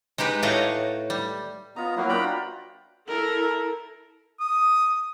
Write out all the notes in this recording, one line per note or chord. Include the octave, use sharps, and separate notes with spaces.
G#3 D#4 G4 B4
A2 A3 F#4 C#5 D#5 F5
G3
B3 F4 D#5 A#5
F#3 A#3 E4 F#4 D#6
D4 F4 B4 G5 A#5 B5
E4 A4 A#4
D#6